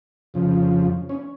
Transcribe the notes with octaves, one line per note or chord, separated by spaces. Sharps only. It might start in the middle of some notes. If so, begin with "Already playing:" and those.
F2 C#3 F3
C#4